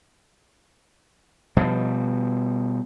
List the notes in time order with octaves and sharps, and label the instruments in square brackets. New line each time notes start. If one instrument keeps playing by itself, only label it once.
[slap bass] B2 F3 G3